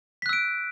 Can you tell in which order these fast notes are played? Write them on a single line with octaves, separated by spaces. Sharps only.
B6 F#6 E6 D7